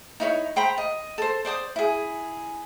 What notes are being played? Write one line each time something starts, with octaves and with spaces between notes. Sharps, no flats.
D#4 E4 C#5
C5 G5 A#5 B5
D#5
A4 C5
C5 D5 D6 D#6
E4 G#4